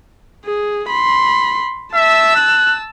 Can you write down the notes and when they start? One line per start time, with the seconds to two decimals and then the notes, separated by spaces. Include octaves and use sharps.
0.45 G#4
0.89 B5 C6
1.94 E5 A5 E6
2.36 F#6